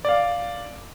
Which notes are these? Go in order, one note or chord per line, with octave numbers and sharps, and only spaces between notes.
D5 F5